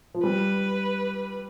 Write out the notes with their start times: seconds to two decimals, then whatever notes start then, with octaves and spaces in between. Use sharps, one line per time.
0.14 F3
0.23 G3 B4